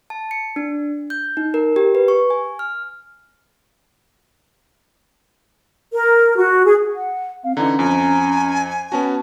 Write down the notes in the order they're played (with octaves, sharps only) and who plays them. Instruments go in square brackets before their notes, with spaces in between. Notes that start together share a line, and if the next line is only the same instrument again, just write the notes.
[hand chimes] A5
C#7
D4
G6
D#4
A#4
G4
B4
C#6
G#5
F6
[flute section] A#4
F#4
G#4
[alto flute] F#5
[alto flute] C4 [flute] F5
[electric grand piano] D3 E3 D#4 [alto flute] C#4 [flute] A#5
[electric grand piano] F2 [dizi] G#5
[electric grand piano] B3 C#4 F#4 [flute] A5